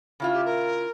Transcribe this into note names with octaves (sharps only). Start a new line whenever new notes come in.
C#3 E4 F4
G4
A#4